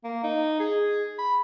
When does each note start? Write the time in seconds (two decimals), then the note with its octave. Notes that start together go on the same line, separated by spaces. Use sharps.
0.04 A#3
0.24 D#4
0.60 G#4
1.19 B5